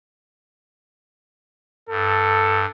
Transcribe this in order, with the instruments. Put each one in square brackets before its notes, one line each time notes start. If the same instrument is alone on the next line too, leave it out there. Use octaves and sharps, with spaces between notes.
[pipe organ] G2 [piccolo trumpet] A4